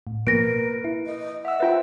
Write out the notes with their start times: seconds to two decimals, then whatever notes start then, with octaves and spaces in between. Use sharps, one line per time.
0.07 A2
0.27 B2 F3 A#3 A#4 B4 A#6 D7
0.84 E4
1.06 D#5
1.45 E5 F#5 E6
1.60 F4 B4 C5 E5 G5